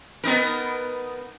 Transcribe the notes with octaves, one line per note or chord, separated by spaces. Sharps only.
B3 D#4 A#4